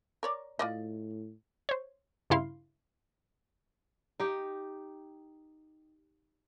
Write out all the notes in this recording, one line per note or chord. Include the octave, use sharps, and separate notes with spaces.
A#4 C#5 D5
A2 F4 D5 D#5
C5 C#5
G2 C#3 E4 F5 C6
D#4 G4